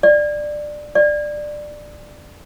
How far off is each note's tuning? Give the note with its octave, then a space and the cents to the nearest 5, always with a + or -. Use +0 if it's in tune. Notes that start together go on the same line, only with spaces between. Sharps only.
D5 +15
D5 +15